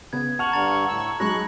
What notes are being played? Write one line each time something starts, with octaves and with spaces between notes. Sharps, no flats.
C#3 B3 G#6
F#5 A5 C#6 F6 F7 F#7
G2 D3 A#5 A6 F7
A2 E6
F#3 G#3 D#4 B5 C#6 F#6 A#6